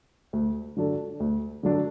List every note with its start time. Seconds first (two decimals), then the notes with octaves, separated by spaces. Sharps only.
0.33 D2
0.77 D3 F#3 D4 A4
1.20 D2
1.63 D3 F#3 D4 A4